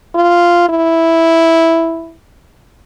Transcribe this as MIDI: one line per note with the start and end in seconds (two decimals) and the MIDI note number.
0.15 0.67 65
0.69 2.14 64